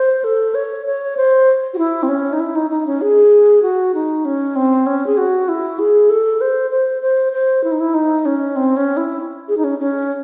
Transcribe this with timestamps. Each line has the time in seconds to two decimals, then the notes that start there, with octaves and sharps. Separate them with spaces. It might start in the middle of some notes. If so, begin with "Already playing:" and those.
Already playing: C5
0.24 A4
0.55 C#5
0.86 C#5
1.17 C5
1.74 F#4
1.78 E4
2.03 C4
2.09 C#4
2.33 D#4
2.40 E4
2.56 D#4
2.71 D#4
2.86 C#4
3.01 G#4
3.63 F#4
3.95 D#4
4.25 C#4
4.56 C4
4.86 C#4
5.07 G#4
5.18 F#4
5.49 E4
5.79 G#4
6.10 A4
6.41 C5
6.71 C5
7.02 C5
7.33 C5
7.64 E4
7.72 D#4
7.80 E4
7.94 D#4
8.26 C#4
8.56 C4
8.77 C#4
8.97 E4
9.48 G#4
9.57 D#4
9.64 C#4
9.79 C#4